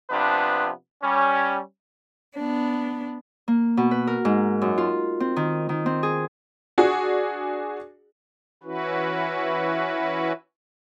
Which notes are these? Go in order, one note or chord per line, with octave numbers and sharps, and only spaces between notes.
C3 F3 B3 D4 B4
G3 C#4
B3 D4
A#3
B2
B4
A#4
G#2
F#2
F4
C4
D#3
D#3
C4
G#4
D4 F#4 G#4
E3 C#4 E4 F#4 B4